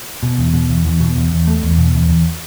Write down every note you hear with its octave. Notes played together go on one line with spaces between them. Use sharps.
B2
E2
B2
E2
E2
B2
E2
E2
A3
E2
B2
E2
E2